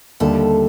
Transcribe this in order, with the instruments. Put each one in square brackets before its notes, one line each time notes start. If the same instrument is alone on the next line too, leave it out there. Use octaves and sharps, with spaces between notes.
[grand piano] D#2 D3 G3 [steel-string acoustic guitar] A3 A4